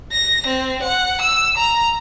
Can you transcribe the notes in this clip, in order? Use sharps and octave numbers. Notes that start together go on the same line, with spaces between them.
A#6
C4
F#5
E6
A#5